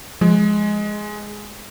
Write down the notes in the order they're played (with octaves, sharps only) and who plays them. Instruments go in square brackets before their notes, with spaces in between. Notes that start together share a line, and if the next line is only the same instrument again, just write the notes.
[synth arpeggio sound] F3 [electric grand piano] G#3